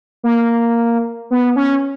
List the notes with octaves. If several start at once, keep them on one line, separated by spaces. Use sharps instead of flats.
A#3
B3
C#4